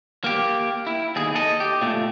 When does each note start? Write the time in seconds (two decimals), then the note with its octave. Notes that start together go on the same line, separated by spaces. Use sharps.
0.24 A#3 G4
0.87 E4
1.16 D#2 G#4
1.35 A4 D#5
1.60 G4
1.81 A#2 A3